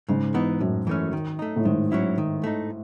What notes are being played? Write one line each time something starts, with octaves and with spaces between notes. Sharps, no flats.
G#2 C#3
E3 B3 D#4
F#2 A2
E3 A3 C#4
D#3
A3 D#4
A2
G#2 D#3
F#3 C#4 E4
D#3
A3 D#4